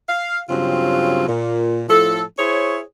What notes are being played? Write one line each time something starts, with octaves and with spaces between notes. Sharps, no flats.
F5
G2 C#3 F#3 C4 F4
A#2
A2 F3 A4
E4 G#4 C5 C#5